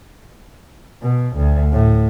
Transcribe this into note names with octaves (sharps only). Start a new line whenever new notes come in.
B2
D2
A2